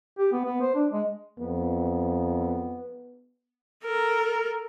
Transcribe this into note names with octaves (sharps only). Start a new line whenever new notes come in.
G4
B3
B3
C5
D4
G#3
F2 B3
A4 A#4